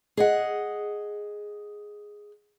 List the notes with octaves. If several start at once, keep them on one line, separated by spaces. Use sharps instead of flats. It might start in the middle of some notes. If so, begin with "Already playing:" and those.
G#4 D#5 F#5